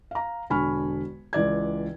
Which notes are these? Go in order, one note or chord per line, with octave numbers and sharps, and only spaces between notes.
F5 A#5
E1 D3 G#5 B5 C#6 F6
C#2 E3 D5 G#6